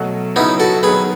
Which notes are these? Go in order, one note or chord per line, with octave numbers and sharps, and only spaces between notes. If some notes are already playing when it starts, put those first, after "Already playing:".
Already playing: B2 F#3 A3
C#3 F#3 B3 C#4 D#4 E4
F#4 A4
D#3 F#3 B3 G#4 B4